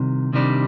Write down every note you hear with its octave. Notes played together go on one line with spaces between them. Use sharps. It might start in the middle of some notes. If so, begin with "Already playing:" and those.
Already playing: C2 C3 D#3
C2 C3 D#3 G3 D4